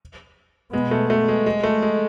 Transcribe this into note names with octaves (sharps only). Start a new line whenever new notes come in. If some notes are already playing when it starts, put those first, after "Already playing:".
B2 G#3 B3
A3
A3
G#3
G#3
A3
G#3